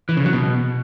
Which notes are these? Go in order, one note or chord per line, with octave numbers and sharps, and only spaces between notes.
E3
C#3
F#3
B2